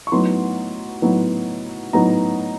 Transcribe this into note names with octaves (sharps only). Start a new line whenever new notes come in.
C#6
A2 F#3 B3 D#4 C6
A2 F#3 B3 D#4
A2 F#3 B3 D#4 A#5